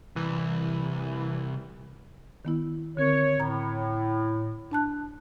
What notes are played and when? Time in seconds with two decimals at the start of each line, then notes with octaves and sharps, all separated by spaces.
0.16 C2 E3
2.45 D#3 B3 E4
2.97 D3 C4 A#4 C#5
3.40 A2 A#5 G#6
4.71 D4 A5 F#6